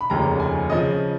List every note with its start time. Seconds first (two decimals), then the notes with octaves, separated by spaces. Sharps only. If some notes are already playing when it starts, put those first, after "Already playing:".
0.01 B5
0.10 F1 D#2 C#3 F3 A#5
0.40 G#5
0.70 C#3 F3 D#5